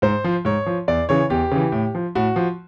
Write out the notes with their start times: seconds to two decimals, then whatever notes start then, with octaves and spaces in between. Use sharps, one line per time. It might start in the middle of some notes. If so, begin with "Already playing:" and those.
0.02 G#2 C5
0.24 F3
0.45 G#2 C#5
0.66 F3
0.88 E2 D5
1.09 C#3 E3 C#5
1.30 E2 G4
1.51 C#3 E3
1.72 A2
1.95 F3
2.15 A2 F#4
2.36 F3